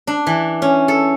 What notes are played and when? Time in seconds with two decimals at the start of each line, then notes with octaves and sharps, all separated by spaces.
0.07 D4
0.27 E3
0.62 C#4
0.88 A4